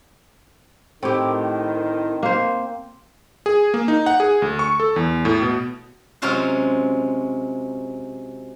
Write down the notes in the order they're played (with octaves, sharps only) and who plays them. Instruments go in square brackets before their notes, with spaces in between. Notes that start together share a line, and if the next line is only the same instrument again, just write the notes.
[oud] A2 G4 [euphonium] D#3 [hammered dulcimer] C4
[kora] A#3 C5
[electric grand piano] G#4
A#3
D#4
F#5
G#4
D2
C#6
A4
E2
A2
B2
[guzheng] C3 F#3 G#3 C#4 F4 C5